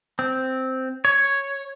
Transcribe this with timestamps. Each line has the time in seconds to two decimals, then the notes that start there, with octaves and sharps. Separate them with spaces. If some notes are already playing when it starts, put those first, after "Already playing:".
0.19 C4
1.05 C#5